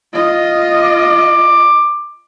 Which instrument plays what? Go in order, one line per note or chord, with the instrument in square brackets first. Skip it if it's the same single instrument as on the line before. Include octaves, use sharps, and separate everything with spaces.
[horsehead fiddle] F4 D#5
[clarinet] D6